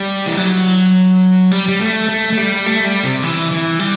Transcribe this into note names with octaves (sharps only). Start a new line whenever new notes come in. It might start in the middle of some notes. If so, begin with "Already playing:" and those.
Already playing: G3
E3
F#3
G3
G3
A3
A3
A3
G3
A3
G3
C3
E3
E3
G3